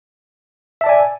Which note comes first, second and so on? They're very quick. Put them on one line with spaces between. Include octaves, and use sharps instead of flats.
E5 A5 D5 G#5